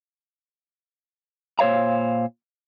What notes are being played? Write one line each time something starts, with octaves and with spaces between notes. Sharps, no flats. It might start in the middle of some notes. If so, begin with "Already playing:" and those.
A#2 C5 C#5 F5 A#5